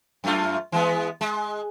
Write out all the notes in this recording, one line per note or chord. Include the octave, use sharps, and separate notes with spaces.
F#2 A3 F4
E3 G#3 B3
G#3